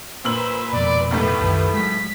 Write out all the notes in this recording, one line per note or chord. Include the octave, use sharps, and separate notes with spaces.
A#2 B4 C5 E6 F#7
F2 B2 D5
D#2 A2 A3 B3 E4 G4 B4
C2 F#2 D#3
F#3 G#3 B6